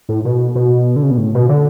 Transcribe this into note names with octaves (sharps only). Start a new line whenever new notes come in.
A2
B2
B2
D3
C#3
B2
A2
B2
D3